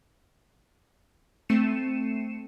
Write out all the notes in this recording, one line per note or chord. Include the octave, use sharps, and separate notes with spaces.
A3 C4 C7 C#7 D#7 E7